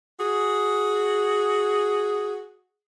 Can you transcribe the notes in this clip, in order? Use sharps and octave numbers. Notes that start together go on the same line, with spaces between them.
F#4 G#4